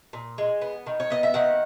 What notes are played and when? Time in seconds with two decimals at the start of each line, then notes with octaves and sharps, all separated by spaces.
0.13 A#2
0.38 G#3
0.61 B3
0.86 D#3
1.00 C#5
1.10 B3 D#5
1.23 E5
1.34 D#3 F#5